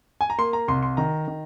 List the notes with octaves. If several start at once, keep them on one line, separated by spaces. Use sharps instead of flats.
G#5
A#5
A#3 C6
A#5
C2 C6
C6
D#3 A#5
D#3